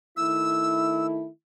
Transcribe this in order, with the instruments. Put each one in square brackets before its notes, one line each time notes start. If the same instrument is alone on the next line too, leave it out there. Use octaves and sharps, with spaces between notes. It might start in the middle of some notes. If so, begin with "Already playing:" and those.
[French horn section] D#3 A3 E4 [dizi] E6